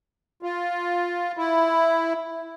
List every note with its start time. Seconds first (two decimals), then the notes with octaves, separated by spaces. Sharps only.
0.43 F4
1.37 E4